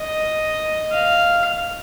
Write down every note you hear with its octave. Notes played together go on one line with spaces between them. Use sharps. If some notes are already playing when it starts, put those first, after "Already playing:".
Already playing: D#5
F5